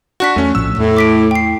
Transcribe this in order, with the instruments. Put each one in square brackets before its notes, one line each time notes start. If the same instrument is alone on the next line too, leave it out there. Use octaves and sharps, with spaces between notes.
[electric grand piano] D4 F#4 [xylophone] C#6 F#6 B6
[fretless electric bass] E2 [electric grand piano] A3 C#4
[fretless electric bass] A#1 A2 F3 [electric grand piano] E6
[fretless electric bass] E2 A3 [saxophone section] A2
[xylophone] D6 B6 D7
G5 C7